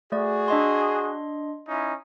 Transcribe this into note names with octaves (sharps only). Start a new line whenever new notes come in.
A3 F#4 G#4 D5
D4 D#5 C6
C#4 D#4 E4